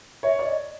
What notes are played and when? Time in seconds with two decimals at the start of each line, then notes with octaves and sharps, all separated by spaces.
0.23 C#5 E5
0.39 D5
0.45 D#5